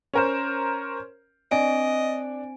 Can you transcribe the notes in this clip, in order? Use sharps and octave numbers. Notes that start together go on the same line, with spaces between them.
C#4 A#4 C5
C4 D4 D#5 G#5 D7